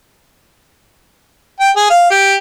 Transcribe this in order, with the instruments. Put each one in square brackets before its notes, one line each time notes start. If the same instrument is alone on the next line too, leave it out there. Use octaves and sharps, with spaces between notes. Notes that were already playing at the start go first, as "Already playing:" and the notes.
[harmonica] G5
G#4
F5
G4